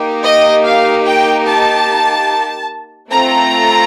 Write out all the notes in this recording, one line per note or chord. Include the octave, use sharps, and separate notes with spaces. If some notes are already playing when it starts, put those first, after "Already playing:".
Already playing: A#3 D#4 G4
D#5
F5
G5
A5
A3 C4 F4 A4 A#5